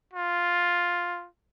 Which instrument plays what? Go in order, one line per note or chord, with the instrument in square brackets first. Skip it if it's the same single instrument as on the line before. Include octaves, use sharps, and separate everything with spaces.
[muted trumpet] F4